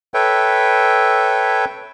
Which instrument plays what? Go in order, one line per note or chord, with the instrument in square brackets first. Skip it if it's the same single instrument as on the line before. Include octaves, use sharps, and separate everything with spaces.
[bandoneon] A4 B4 C#5 E5 G5